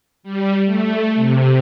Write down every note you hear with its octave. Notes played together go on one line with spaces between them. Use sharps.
G3
A3
C3